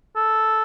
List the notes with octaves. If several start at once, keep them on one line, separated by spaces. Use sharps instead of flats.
A4